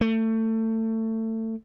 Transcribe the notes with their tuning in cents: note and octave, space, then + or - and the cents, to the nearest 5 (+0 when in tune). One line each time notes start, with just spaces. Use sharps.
A3 +25